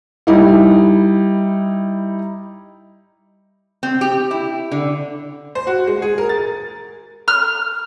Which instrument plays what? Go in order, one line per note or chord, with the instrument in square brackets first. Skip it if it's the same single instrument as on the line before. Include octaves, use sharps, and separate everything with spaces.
[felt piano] G3 D#4 E4
[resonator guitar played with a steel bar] C4
G4
E4
D3
[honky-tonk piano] C5
F#4
G#3
G#4
A#4
A6
[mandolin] F6